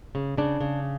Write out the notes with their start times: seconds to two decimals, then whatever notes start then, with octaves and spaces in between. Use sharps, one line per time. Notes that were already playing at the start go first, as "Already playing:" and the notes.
0.15 C#3
0.37 C#3 D4
0.60 C#3